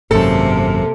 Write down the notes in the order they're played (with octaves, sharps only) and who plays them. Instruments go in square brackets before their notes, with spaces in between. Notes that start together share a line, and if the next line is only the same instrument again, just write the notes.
[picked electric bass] G#1 F#2 [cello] C3 A#3 [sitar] A4